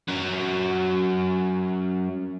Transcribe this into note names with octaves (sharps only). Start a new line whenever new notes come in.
F#2 F#3